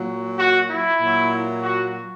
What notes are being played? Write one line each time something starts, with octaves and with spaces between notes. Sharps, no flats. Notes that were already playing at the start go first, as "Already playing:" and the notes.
Already playing: A#2 F#3
F#4
E4
A#2 F#3
F#4